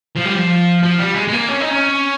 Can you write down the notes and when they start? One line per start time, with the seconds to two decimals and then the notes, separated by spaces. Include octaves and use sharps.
0.16 F3
0.26 G3
0.37 F3
0.83 F3
0.99 G3
1.15 G#3
1.28 G#3
1.33 A#3
1.48 C#4
1.60 D#4
1.71 C#4